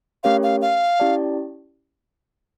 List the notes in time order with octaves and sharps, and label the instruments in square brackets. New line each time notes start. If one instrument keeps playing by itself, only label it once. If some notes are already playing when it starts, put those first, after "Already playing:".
[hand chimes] A3 C#4 G4 A#4 C#5 [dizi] F5
[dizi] F5
F5
[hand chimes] C#4 E4 G4 D5 A5